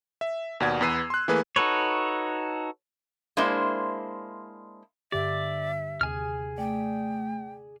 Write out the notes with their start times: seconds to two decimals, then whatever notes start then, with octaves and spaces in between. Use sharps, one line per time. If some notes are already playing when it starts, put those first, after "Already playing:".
0.21 E5
0.60 D#2 B2 D5 F#5 G#6
0.81 E2 B3 B4 E6 C7 D#7
1.10 C6 F#6
1.28 E3 A3 A#3 G#4 B4
1.56 D#4 F#4 A4 B4 C#5
3.37 G#3 A#3 D4 E4 C5
5.12 G2 D3 G4 D5 E5
6.01 D#2 C3 G#4 G#5 F6
6.58 A3 D5 G5